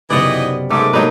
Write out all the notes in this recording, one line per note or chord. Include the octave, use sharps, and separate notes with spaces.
F#1 C3 E3 F#3 B3 D#4 D5 D#5
G#2 A3 G4 A#4 D6 E6
B2 E3 F#3 A#3 D#4 B4